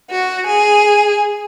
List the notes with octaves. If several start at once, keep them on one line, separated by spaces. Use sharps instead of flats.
F#4
G#4